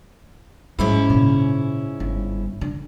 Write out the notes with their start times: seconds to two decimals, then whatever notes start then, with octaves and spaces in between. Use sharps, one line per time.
0.79 G#2 F#3 G#3 C#4 E4
1.10 A#2 C#3
2.00 G1
2.61 D3